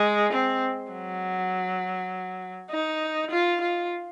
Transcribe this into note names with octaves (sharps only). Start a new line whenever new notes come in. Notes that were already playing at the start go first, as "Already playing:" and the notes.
Already playing: G#3
C4
F#3
D#4
F4
F4